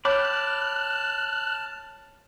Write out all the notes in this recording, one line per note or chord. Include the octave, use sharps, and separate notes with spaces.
C#5 G5 A5 B5 D6 F6 F#6